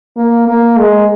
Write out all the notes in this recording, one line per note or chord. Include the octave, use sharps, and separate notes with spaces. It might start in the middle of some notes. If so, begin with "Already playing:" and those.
A#3
A#3
G#3